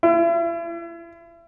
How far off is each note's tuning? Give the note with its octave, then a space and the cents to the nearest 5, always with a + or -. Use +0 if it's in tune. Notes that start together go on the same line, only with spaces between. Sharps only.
E4 +40